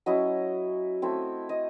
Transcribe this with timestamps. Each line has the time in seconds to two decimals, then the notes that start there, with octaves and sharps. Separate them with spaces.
0.06 F#3 C#4 E4 D#5
1.02 A3 C4 E4
1.49 D#5